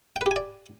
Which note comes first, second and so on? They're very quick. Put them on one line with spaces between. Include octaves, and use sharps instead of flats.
G5 B4 G4 G#5 D5